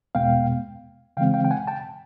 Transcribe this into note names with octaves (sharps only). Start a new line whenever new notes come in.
E2 B2 G#3 B3 F5 G5
C#3 E3 G#3 C4 F5 G5
F5 G5
G5
F#5 G#5
G5 A5